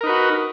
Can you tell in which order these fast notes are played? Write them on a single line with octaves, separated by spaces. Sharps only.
A#4 D#4 B4 F#4